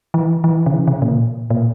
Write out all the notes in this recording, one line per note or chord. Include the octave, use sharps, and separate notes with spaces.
E3
E3
C#3
E3
C#3
A#2
A#2